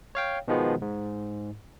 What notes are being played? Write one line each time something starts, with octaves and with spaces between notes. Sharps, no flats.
C#5 F5 G5
B2 D#3 F3 G#3 B3
G#2